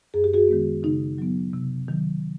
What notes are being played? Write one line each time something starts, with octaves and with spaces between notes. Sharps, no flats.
F#2 G#4
G4
F#4 G#4
D#3 G#3 B3
C#3 D#4
F#3 B3
C3
D#3 F#3